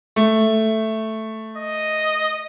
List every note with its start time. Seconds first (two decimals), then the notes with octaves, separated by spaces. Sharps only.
0.16 A3
1.58 D#5